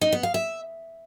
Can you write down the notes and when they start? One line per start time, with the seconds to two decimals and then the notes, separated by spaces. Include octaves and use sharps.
0.01 D#4
0.12 B3
0.23 F5
0.34 E5